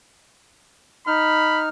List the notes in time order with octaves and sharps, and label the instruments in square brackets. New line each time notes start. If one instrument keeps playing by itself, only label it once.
[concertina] D#4 F6 [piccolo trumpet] B5